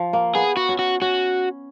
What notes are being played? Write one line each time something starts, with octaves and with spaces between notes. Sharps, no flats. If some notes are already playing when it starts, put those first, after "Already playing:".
Already playing: F3
A#3
B3 G#4
F#4
C#4
F#4
C#4 F#4